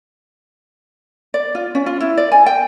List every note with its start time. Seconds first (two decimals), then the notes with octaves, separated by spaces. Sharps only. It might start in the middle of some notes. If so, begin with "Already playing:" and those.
1.34 D5
1.55 F4
1.75 C#4
1.86 F4
2.00 E4
2.17 D5
2.32 G#5
2.46 G5